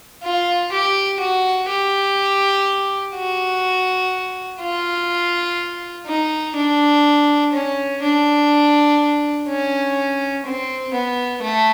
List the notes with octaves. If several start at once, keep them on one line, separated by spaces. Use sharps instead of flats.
F4
G4
F#4
G4
F#4
F4
D#4
D4
C#4
D4
C#4
C4
B3
A3